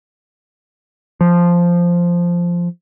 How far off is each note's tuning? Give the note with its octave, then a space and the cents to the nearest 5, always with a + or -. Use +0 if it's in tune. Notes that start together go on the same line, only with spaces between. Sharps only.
F3 -5